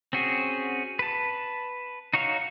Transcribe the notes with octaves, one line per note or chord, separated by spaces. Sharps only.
C4 C#4 F#4 G#4
B4 A5
D#4 F#4 C#5 F5